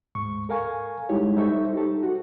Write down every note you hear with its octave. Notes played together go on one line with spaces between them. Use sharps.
D2 G#2 C#6
A4 A#4 F5 G#5 C#6
G3 G#3 D#4 E4 G4 C#5
G3 D#4 A4 C5 E5 C#6
D#4 G4 A4
F#4